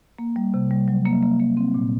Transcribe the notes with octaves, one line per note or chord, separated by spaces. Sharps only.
A#3
G3
C3
G3
F#3
A#3
A#3
A#3
C4
A#2